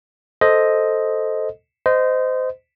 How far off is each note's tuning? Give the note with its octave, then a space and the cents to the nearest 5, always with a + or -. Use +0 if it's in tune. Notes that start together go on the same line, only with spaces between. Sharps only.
A4 +0 C5 +0 D#5 +5
C5 -25 D#5 +0